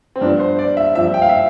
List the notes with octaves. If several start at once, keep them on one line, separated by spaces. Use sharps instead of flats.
C4
G2 F3 B3 D4
C5
D5
E5
G2 F3 C4 E5
G5
F5
E5